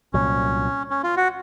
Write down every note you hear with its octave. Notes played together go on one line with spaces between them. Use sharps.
C2 A#2 F#3 C#4
C#4
F4
F#4